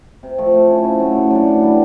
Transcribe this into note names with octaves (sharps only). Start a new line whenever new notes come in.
C3
F3 A3
A3
C#4 E4
C#3
F#3 A3
A2
F#3 A#3 D4
A2
E3 G3